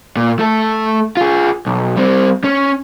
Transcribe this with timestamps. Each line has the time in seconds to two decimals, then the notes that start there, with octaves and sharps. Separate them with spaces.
0.17 A#2
0.39 A3 A4
1.17 F4 G#4
1.66 B1
1.97 G3 C4
2.44 C#4